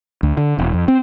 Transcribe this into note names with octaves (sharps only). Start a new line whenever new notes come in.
D2
D3
E1
F2
C4